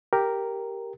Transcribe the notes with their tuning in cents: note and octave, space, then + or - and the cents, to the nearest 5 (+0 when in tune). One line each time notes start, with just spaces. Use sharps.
G4 +0 A#4 +0